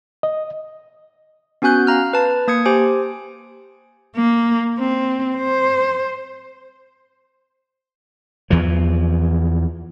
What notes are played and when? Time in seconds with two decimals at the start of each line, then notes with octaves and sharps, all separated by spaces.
0.23 D#5
1.62 B3 C#4 F#4 G#5 F#6 G6
1.87 F5 A#5 F6
2.13 B4 A5
2.48 A#3 D#6 G#6 C#7
2.65 G4 C5 G#5 D7
4.16 A#3
4.78 C4
5.37 C5
8.50 E2 E3 F3